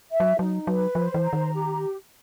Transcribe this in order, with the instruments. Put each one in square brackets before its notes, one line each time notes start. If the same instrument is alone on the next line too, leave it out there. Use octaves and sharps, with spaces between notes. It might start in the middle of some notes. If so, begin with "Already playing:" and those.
[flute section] E5
[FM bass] F#3
[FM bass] F#3 [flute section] D#4
[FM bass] F#3 [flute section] B4
[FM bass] F3 [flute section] C5
[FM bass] E3
[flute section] A#5
[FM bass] D#3
[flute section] G4